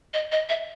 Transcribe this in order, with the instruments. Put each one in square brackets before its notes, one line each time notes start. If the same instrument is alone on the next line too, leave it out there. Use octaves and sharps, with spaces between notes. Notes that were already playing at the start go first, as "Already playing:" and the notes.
[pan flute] D#5
D#5
E5